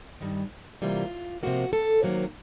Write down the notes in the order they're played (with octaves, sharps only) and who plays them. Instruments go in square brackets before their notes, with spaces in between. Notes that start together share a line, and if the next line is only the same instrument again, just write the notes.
[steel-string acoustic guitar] G2 D#3 G3
C3 E3 G3 A#3 F4
C3 F3 A#3 F#4
A4
C3 D#3 F#3 A#3